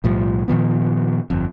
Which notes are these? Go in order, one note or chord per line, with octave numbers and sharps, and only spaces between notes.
B1 A2 F3 G3
A#2 D#3 F3 B3
G1 F2